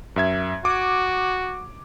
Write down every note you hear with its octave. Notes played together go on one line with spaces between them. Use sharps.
F#2 E5 G#6
F#4 D6